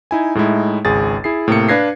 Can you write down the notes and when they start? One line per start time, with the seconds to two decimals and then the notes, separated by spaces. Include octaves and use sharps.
0.11 D#4 E4 G#5
0.35 A2 G#3 D#4 E4
0.85 G#1 C#2 G#4 A6
1.24 E4 G#4 C7
1.48 A2 C3 A#3 C#7
1.69 D4 B4 F5 G#6 A#6 C7